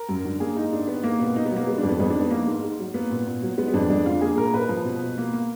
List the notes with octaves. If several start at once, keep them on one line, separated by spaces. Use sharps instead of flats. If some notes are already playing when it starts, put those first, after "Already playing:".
Already playing: A#4
F#2
D3
A#3 G#4
G#2 D#4
G#2 D4
D#3 B3
A#3
B2 B3
B2 D#4
B3
F#3
A#3
G#3 B3
D4
F2
B3
F2 B3
D4
D#3
B3
A#3
G#2
G#2
F#3
A#3 B3
A#2
A#2
F#3
G#3 B3
B3
F2 D4
F2 D4
D3 F4
A#3 G#4
A#2 A#4
A#2 B4
F3
B2
B2
A#3
A#3